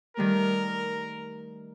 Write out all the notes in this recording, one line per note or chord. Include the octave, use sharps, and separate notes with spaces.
D#3 G3 A3 A#4